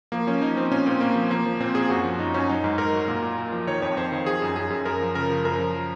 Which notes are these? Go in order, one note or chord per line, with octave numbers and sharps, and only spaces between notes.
F3 A#3
F3 C#4
F3 D#4
F3 C4
A#2 C#4
A#2 C4
A#2 A#3
F3
F3 A#3
F3
A#2 C4
A#2 G#4
F#2 F#4
F3
F#2 D#4
F#2 C#4
F#3 D#4
G#2
G#2 A#4
F#3
A#2
A#2
A#2
F3
D#3 C#5
F2 C#5
F2 C5
D#3
F3 G#4
F#2
F#2 G#4
F#2
F#2 A#4
F3
C#3 A#4
F3
F#2 A#4
F3